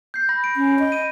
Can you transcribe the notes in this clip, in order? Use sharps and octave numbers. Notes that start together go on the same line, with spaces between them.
G6 C7
B5 A#6
D7
C#4
D#5
D#7